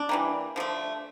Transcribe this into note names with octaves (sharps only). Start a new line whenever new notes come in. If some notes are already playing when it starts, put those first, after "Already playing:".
Already playing: D4
E3 G3 A#3
D3 F3 A3